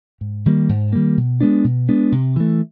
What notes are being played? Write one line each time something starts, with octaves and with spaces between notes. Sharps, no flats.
G#2
D#3 G3 A#3
G#2
D#3 G3 A#3
B2
G#3 B3 D4
B2
G#3 B3 D4
C3
E3 A3